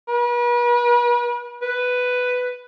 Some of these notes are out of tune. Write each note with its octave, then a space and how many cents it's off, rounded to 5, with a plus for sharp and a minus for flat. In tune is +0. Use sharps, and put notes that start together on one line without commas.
B4 -40
B4 +5